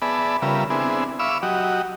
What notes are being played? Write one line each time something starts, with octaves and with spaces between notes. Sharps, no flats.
B3 G#4 D5 E5 A5 B5
C#3 G3 F4 A#4 B4 E5
B3 C4 D4 E4 G#4
E5 F5 B5 C#6 D6 E6
F#3 F#4 G4 D#5